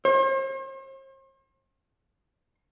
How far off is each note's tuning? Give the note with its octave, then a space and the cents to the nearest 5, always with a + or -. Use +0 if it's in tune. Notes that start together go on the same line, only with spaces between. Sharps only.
C5 +45